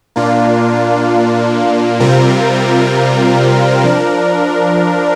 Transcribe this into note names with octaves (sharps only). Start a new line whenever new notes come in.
A#2 A#3 D4 F4
C3 G3 C4 F4 A#4
F3 D4 A#4